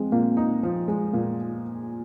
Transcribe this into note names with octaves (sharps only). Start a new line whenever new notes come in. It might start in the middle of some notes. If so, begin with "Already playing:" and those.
Already playing: F3 G#3 C4
A#2 A#3
D#4
F3
G#3
A#2 A#3